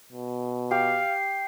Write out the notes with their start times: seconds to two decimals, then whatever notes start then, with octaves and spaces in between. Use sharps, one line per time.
0.12 B2
0.71 G4 F5 C7